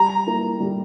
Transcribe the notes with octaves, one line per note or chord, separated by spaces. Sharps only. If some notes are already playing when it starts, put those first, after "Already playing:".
Already playing: G3 A#5
A#3 E4
G3